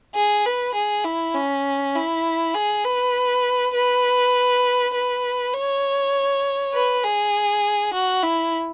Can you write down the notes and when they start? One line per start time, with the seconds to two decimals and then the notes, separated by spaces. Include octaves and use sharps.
0.15 G#4
0.45 B4
0.74 G#4
1.05 E4
1.34 C#4
1.95 E4
2.54 G#4
2.84 B4
3.74 B4
4.94 B4
5.53 C#5
6.74 B4
7.04 G#4
7.93 F#4
8.23 E4